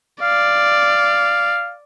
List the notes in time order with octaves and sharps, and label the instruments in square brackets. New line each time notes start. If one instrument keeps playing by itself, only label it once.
[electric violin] D5 [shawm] F5